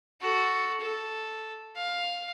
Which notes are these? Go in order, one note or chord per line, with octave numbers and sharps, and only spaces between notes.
F#4 A4
A4
F5